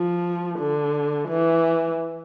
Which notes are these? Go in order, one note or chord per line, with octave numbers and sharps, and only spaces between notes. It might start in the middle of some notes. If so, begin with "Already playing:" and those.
Already playing: F3
D3
E3